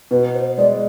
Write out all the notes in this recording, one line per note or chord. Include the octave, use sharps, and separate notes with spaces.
B2 B4
C5
G#3 D5